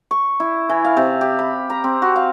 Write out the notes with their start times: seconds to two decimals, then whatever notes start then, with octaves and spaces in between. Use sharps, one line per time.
0.11 C#6
0.40 E4
0.69 E3
0.84 F5
0.97 C3
1.21 G4
1.39 B5
1.70 A#5
1.84 C4
2.02 F#4
2.16 F5